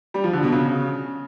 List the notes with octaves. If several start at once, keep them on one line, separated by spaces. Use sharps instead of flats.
G3
F3
D3
B2
C#3